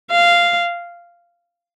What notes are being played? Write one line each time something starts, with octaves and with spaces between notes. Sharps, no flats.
F5